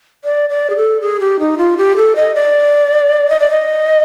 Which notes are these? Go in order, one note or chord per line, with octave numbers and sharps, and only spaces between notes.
D5
D5
G#4
A4
G#4
G4
D#4
F4
G4
A4
D#5
D5
D#5
D5
D#5